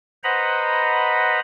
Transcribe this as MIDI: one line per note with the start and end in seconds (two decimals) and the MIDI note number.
0.24 1.40 71
0.24 1.40 72
0.24 1.40 75
0.24 1.40 78
0.24 1.40 82
0.24 1.40 83